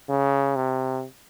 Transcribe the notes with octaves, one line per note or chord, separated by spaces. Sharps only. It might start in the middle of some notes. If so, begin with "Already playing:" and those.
C#3
C3